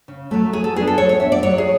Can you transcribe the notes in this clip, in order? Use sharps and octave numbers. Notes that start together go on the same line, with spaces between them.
C#3
F#3 A3
F#3 G#4
A4
B3 D4 G#4
A4
F#3 C#5
C#5
B3 D4 E5
D5
F#3 C#5
G#4